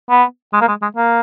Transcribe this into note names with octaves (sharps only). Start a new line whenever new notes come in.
B3
G#3
A#3
G#3
G#3
A#3